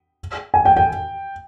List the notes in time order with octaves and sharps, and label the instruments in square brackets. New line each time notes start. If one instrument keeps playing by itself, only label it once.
[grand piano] G#5
G5
G5